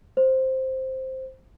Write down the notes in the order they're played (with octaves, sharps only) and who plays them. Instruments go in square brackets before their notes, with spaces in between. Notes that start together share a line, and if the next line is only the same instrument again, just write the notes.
[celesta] C5